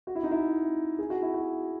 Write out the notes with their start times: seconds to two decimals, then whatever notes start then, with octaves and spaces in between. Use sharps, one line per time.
0.07 F#4
0.15 E4
0.23 D#4
0.31 E4
0.99 G#4
1.10 F#4
1.22 E4
1.34 F#4